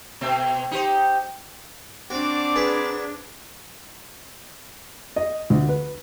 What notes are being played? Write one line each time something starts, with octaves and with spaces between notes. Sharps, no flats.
B2 A3 C4
D#4 G4 C5
C4 D4 F#4 D6
F#3 G#4 B4
D#5
D2
B4